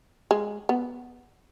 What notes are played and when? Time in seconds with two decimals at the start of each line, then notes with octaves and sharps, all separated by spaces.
0.31 G#3
0.69 B3